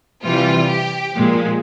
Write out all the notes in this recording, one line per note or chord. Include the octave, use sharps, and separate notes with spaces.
C3 E3 G3 F4
G4
A#2 F3 G#3